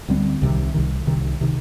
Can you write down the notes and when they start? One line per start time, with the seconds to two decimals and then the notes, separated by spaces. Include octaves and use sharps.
0.09 D2 D3 G3 C4
0.42 C2 C3 D#3
0.74 C2 C3 D#3
1.07 C2 C3 D#3
1.41 C3 D#3